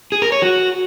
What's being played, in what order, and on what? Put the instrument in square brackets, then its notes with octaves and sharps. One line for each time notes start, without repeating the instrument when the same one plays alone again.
[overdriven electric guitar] G#4
A#4
C#5
F#4